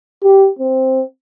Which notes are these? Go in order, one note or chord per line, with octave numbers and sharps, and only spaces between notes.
G4
C4